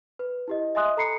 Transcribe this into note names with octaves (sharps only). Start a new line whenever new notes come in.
B4
E4 G4 D#5
D#5 E5 G#5 C6 D#6 F#6
A4 A#5 B5 C7 C#7